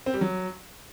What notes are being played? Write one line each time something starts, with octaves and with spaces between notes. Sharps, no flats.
C4
G3
F#3